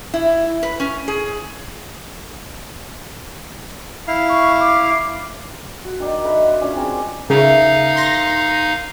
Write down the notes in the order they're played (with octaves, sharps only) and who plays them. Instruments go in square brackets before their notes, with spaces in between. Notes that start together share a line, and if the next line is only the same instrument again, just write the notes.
[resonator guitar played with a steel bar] E4
B4
C#4
G#4
[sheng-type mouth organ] E4 F5
[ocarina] C#6
D6
[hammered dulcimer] F#4
D#3 D4 D#4
A#4 B4 E5 F#5
F#5 C6
C#4 D4 F4
C4 G#4 A#4
[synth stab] C#3 [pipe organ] D#4 F5 [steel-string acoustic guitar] A#4 E5
[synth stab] C6 A#6